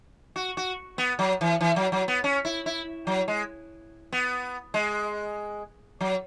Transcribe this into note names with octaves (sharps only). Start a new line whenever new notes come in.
F#4
F#4
B3
F#3
E3
E3
F#3
F#3
B3
C#4
E4
E4
F#3
G#3
B3
G#3
F#3